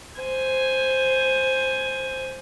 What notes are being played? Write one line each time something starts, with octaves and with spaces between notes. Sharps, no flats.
C5 G#5